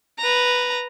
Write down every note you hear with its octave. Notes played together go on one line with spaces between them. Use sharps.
B4 A#5